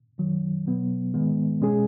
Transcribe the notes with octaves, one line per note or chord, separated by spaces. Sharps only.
F#2 D#3 F#3
B2 F#3 B3
G#2 D#3 G#3 B3
B2 G#3 C#4 G#4